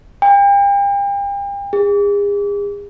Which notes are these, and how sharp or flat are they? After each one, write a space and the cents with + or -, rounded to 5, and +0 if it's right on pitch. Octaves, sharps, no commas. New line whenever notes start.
G5 +40
G#4 -40